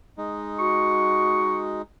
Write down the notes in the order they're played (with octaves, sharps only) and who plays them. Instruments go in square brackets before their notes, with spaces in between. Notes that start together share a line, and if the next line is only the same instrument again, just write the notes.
[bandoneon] G#3 D#4
[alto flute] F#4 [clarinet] C#6